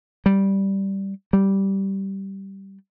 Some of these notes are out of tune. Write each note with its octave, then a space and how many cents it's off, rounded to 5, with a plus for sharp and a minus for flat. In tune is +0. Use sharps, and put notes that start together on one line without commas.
G3 -5
G3 -10